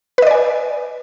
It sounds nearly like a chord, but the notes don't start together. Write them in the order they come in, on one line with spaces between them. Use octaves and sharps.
B4 D#5 D5 G#5